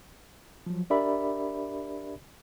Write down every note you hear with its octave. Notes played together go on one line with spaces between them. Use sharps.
F3 F#3
D4 G4 A#4 D5 E5 B5